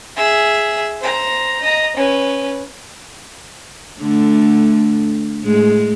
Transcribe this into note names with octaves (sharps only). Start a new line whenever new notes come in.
G#4 E5
C5 A#5
D#5 A#5
C#4 B4
D3 A3
A2 G#3